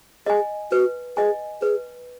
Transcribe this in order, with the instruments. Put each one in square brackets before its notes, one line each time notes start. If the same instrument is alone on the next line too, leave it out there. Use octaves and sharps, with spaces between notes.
[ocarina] G#4 [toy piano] D#5 G#5
[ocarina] F#4 [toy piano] B4
[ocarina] G#4 [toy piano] D#5 G#5
[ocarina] G#4 [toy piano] B4